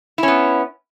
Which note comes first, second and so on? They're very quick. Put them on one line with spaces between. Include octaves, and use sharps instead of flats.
E4 C#4 B3